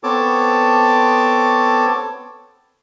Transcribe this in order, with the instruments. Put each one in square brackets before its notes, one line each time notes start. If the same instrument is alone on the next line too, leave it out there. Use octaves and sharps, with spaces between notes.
[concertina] B3 C4 A4 C#5 A5 D6